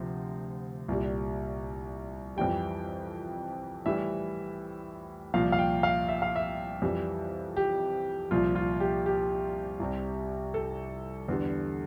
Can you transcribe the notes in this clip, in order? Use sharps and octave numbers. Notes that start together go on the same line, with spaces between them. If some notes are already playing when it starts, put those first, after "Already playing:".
Already playing: D2 C3 F3
C2 A#2 G3
F2 E3 G3 G5
A2 E3 G3 E5
C2 A#2 F3 F5
F5
G5
F5
E5
F5
E5
F2 E3 G3
G4
C2 A#2 F3 F4
F4
G4
G4
C2 C3 G3
A4
E2 D3 G3